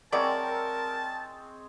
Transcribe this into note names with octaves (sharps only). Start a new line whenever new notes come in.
F#3 G#3 C4 E4 A#4 C#5 D5 A5